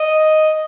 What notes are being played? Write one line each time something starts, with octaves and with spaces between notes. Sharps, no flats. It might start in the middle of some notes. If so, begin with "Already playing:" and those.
Already playing: D#5